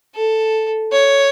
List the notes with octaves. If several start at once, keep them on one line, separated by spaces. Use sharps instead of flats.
A4
C#5